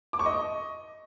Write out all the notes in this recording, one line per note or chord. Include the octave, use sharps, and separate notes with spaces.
D6
C#6
D#5